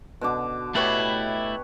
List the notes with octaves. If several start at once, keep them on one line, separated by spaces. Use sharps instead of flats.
B2 D3 D6
A3 E4 G4 B4 C#5